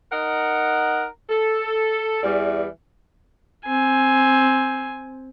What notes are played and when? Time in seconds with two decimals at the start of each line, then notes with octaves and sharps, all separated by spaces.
0.11 D#4 A#4 F#5
1.30 A4
2.23 E2 E3 G3 D5
3.65 C4 G#5